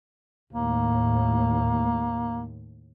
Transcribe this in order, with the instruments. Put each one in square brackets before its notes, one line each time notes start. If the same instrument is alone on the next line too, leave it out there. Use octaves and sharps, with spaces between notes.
[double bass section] D#2 A2 [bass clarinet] A#3